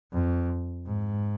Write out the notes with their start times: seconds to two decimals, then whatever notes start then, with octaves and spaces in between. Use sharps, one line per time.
0.13 F2
0.86 G#2